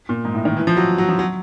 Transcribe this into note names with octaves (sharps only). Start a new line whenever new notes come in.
A#2
G#2
A2
D#3
E3
F3
F#3
F#3
F3
F#3